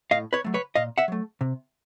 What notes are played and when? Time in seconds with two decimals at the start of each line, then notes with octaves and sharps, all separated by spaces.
0.11 A2 D#5 F5
0.33 B4 C#5
0.44 F#3 A3
0.54 B4 C#5
0.75 A#2 D#5 F5
0.98 E5 F#5
1.08 F#3 A3
1.41 C3